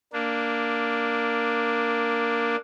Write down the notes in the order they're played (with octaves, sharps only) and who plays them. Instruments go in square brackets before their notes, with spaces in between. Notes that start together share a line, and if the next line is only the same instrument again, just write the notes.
[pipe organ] A#3 D4